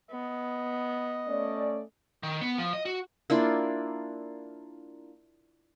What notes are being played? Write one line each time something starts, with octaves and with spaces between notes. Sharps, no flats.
B3 D#5
A3 C#4 D5
D#3
B3
F3
D#5
F#4
A#3 D4 E4 F4